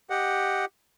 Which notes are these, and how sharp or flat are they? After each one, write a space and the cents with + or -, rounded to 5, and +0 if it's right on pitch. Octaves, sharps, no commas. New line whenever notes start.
G4 +0 D#5 +0 F#5 +0